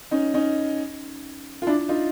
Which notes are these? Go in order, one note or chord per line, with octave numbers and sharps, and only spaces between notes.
C#4 D#4
C#4 D#4
F4
D4 E4
D#4 F4